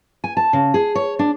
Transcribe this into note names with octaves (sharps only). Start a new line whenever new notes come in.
G#5
A5
C#3
G#4
C#5
D4